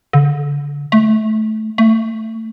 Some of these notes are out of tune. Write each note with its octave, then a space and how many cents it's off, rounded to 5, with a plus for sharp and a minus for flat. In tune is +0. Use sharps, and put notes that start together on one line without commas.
D3 -30
A3 -15
A3 +20